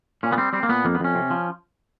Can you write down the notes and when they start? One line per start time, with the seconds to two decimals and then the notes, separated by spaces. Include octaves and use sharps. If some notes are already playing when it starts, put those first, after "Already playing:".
0.23 A#2 C#4
0.32 B3
0.38 G3 C4
0.53 G3 C4
0.63 A#3
0.69 A#2 B3
0.85 F2 A#3
0.95 B3
1.00 F2 C#4
1.15 C3
1.30 F3